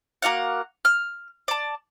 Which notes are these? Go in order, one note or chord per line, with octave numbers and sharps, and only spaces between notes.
A#3 F#4 F5 F#5
F6
D5 A5